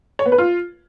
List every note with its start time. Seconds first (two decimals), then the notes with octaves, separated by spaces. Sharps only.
0.19 C#5
0.26 B3
0.32 B4
0.38 F4